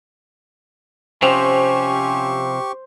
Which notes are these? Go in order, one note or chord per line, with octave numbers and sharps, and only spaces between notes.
C3 F3 C4 C#4 G4 C5 C#6